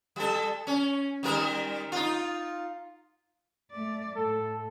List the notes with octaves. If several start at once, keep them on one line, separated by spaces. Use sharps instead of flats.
G3 A4
C#4
D#3 G3 A#4
D#4 F4
A3 D5
A2 A4